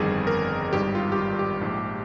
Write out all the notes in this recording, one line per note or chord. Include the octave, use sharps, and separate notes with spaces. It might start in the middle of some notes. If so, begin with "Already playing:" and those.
Already playing: G1 F2 D#3 G3 G#4
A#4
G#1 G2 D#3 G3 G4
F4
G4
F4
G4
A#1 G#2 F3